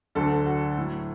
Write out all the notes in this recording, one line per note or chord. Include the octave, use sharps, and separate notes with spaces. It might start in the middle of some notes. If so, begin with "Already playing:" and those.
D2 D3 F#3 A4
F#4
A2 F#3